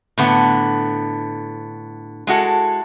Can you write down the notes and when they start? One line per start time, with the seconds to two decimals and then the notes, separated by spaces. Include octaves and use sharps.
0.18 A2 D3 B3
2.27 G#3 E4 F#4 A4